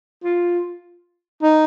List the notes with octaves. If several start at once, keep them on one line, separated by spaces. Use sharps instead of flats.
F4
D#4